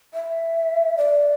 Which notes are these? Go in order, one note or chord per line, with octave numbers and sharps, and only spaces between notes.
E5
D5